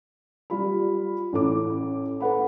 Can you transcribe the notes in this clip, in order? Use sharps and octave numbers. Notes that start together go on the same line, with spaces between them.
G3 F4 B5
A1 A4 D6
A4 B4 F#5 B5